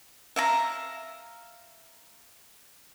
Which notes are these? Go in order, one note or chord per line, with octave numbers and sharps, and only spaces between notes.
E5 F5 A#5